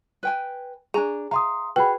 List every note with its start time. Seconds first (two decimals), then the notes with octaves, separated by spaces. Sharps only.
0.23 B4 G5 G#5
0.94 D4 G#4 G#5 A#5
1.31 F5 G#5 A#5 C6 D#6
1.76 F#4 G#4 B4 G5 B5